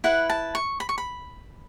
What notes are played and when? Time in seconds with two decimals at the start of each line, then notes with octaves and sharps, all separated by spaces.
0.04 E4 B4 F#5
0.30 A5
0.55 C#6
0.80 B5
0.89 C#6
0.98 B5